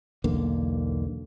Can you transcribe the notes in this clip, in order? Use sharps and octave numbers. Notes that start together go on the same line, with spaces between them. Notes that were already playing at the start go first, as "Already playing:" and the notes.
B1 E2 D3 A#3